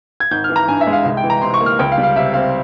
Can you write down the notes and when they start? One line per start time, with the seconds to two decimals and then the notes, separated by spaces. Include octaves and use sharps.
0.20 G#6
0.31 G#1 G6
0.44 F6
0.49 E3
0.56 A#5
0.68 G2 G#5
0.81 E5
0.87 G#3
0.93 F5
1.05 C2
1.17 G5
1.24 E3
1.30 A#5
1.42 C3 C6
1.54 C#6
1.61 A#3
1.66 F6
1.79 C#2 G5
1.92 F5
1.98 G3
2.03 F5
2.16 C3 E5
2.34 C4 F5